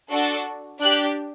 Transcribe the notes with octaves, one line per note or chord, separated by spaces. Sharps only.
D4 F#4 A4
D4 G4 F#6